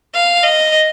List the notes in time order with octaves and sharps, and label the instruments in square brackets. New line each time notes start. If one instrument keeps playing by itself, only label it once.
[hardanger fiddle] F5
D#5